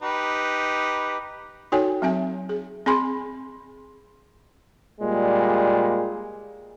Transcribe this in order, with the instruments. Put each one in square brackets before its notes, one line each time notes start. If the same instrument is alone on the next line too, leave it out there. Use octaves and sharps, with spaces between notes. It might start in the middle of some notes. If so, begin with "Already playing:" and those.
[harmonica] D#4 G4 B4
[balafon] D#4 F#4 A4 C#5 G5 G#5
F#3 C4 E5 G#5
G#4
C4 G#4 G#5 B5 C6
[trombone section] A#2 G3 G#3